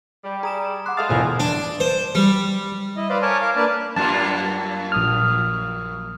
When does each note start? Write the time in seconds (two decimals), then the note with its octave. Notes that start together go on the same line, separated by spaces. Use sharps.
0.24 G3
0.43 G#4 A#5 D#6 E7
0.86 F#5 C6 D6 F#6
0.97 G#3 A4 E5 F5 A5 D#6 A6
1.09 E1 A2 D3 F3 G#4 G#5
1.40 D4
1.80 C5
2.15 G3
2.96 E4 D#5
3.09 B4 C5 D5 F5
3.22 A#4 C#5 G#5 A5 D6
3.42 A#4 F5 D6
3.56 A#3 D4 B4 D5 A5
3.96 F#2 A#3 F4 A5
4.92 A#1 D#6 F6